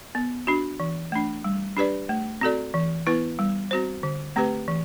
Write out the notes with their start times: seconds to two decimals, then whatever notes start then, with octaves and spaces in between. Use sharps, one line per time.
0.15 B3
0.47 D4 F#4
0.80 E3
1.12 A3 D4
1.44 G3
1.77 D4 G4 B4 D5
2.09 A3
2.41 C4 F#4 A4 D5
2.74 E3
3.07 B3 E4 B4
3.39 G3
3.71 C4 F#4 C5
4.03 D3
4.36 A3 C4 G4 B4
4.68 E3